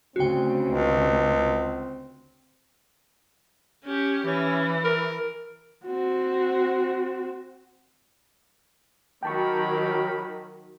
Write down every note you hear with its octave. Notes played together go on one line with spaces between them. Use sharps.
D2 C#3 C4 F#4 G5
C#2
C#4 G4
E3 C#4
A#4
C4 F#4
D#3 F#3 G4 A#4 G5 A5 B5 C#6